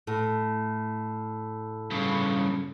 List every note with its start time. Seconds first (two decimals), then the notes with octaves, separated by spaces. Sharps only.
0.07 A2
1.91 G2 C#3